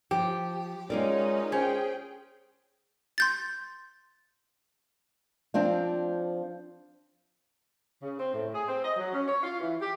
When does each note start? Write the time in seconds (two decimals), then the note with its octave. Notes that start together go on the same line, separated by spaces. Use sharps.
0.11 F3 G4
0.90 G#3 C#4 D#4 F4 A#4 D5
1.52 C#4 G#4 C5 G5
3.18 C6 G6 A6
5.54 F3 C4 D4 F4
8.02 C#3
8.19 C4
8.34 A2
8.54 G#4
8.68 C4
8.83 D#5
8.97 F#3
9.13 C#4
9.27 C#5
9.43 F4
9.61 E3
9.81 G4